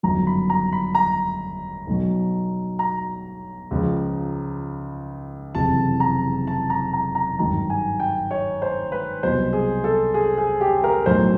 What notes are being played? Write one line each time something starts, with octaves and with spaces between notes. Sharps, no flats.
G1 F#2 D#3 F#3 A#5
B5
A#5
B5
A#5
B1 B2 F#3
A#5
C#2 C#3 F3
F#1 F2 C3 E3 A5
A#5
A5
A#5
A#5
A#5
G#1 G2 D#3 F#3 A#5
G#5
G5
C#5
C5
B4
C2 B2 F#3 C5
G#4
A4
G#4
G#4
G4
A#4
B1 A2 F#3 C5